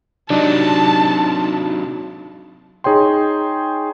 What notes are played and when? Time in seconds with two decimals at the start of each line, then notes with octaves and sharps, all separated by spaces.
0.30 C3 F#3 D4 D#4 A5
2.84 D#4 G#4 C#5 G5 C6